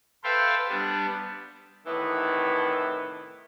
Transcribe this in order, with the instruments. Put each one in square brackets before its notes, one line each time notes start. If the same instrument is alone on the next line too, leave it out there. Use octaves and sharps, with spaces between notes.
[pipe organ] A4 B4 C5 E5 F5 G5
G3 B3 D4
[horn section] A2 C3 D#3 E3 B3